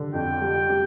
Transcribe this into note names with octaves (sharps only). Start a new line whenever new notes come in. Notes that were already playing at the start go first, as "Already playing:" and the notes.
Already playing: D3 G3
F2 G5
G3
G3